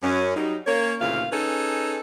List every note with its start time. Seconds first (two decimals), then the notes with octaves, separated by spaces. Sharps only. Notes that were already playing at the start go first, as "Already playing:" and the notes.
0.03 F#2 C#4
0.36 F#3 G3 D#4
0.67 A#3 C#4 C#5
1.01 D2 A#2 C#3 E3 F4 F5
1.32 C#4 D#4 G#4 A4 B4